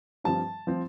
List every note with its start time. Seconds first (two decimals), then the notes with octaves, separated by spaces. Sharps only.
0.24 G2 F3 C4 A5
0.67 F3 C4